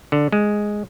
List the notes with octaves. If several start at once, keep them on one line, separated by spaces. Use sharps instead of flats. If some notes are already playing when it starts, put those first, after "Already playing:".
D3
G#3